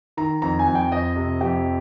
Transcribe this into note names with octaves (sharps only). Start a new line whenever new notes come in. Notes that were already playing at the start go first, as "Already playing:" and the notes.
D#3 A#5
F2 A#5
G#5
F2
G5
F2 D#5
C3
F2 G4